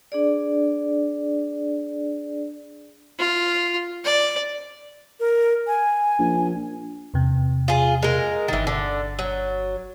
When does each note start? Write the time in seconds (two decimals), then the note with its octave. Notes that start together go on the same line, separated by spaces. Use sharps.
0.12 D4 G#4 D5
3.19 F4
4.05 D5
5.20 A#4
5.67 G#5
6.19 A#1
7.14 E2 C3
7.68 F4 G#4
8.03 G#3 A#4
8.48 G1 D#3 E3 A6
8.67 D3
9.19 F#3